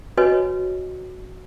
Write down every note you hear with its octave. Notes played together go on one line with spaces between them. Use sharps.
F#4 B4 C#5 D#5 G#5